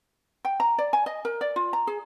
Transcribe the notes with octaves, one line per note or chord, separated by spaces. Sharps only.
G5
A#5
D5
G#5
D#5
A#4
D5
F4
A#5
G#4